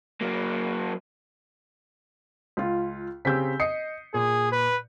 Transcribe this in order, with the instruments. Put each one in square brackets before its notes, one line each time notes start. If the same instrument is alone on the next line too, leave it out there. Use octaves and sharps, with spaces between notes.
[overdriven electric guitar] F#3 A#3
[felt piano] C#2 F4
[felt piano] C#3 C4 G4 [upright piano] E6 G6 B6
[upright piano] D#5 C7 C#7 [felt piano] D#6
[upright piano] A#2 [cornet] G#4
[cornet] B4